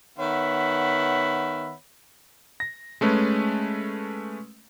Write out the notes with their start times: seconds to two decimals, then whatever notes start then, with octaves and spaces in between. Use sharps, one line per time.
0.18 D#3 B3 C#5 E5 F#5 B5
2.60 A#6
3.01 G#3 A3 C#4 B4